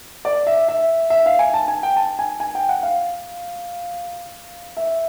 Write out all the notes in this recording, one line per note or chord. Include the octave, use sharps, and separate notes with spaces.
D5
E5
E5
E5
F5
G#5
A5
G#5
G5
A5
G#5
G#5
G5
F#5
F5
E5